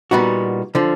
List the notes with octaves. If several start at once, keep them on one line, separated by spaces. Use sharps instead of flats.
A#2 G3 B3 D#4 F#4
D3 F3